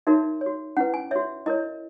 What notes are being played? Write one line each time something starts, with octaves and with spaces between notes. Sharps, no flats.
D#4 F#4 A#4 C#5 E5
C#5
F#4
C#4 E4 B4 F#5
G#5
F#4 C#5 E5
E4 A#4 C#5 D#5